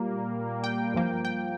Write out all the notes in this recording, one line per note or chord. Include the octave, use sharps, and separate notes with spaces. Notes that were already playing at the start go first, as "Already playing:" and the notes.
Already playing: A#2 G3 A#3
G5
G2 F3 A#3
G5